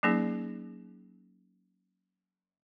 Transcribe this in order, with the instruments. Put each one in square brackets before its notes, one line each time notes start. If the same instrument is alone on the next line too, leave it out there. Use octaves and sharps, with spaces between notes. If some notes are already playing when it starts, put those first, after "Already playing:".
[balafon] F#3 A#3 C#4 D#4 G#4